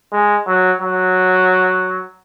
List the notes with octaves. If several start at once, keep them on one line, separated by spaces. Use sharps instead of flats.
G#3
F#3
F#3